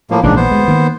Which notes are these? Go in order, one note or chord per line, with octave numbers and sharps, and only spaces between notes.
A2 F3 A#3
A#1 G#2 C#3 E3 A#3 D4
B3 C5
D2 G#3
D#3 A#3